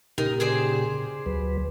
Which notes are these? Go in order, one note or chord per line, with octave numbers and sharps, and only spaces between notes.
A#2 C#3 D#4 G4 A#4
G#4 C5 D5
D2 F#3 B4